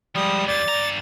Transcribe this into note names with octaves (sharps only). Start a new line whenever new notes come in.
F3 G3 G#3 D#6
D#2 D5 A6
G2 A#5